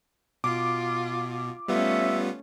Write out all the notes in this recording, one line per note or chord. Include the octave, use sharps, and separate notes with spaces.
B2 F4 D6
G3 A3 B3 C#4 F4 E5